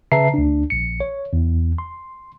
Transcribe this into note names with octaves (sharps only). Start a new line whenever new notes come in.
C#3 B4 E5 A5 A#5 C7
D2 D4
A#1 C#7
C#5
E2
C6